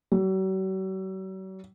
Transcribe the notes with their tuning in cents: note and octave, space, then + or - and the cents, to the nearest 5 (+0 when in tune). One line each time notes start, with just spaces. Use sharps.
F#3 +45